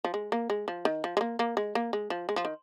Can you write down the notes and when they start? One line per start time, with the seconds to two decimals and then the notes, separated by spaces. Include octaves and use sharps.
0.04 F3
0.14 G#3
0.32 A#3
0.50 G#3
0.68 F3
0.85 D#3
1.04 F3
1.17 G#3
1.21 A#3
1.39 A#3
1.57 G#3
1.75 A#3
1.93 G#3
2.10 F3
2.29 G#3
2.36 F3
2.45 D#3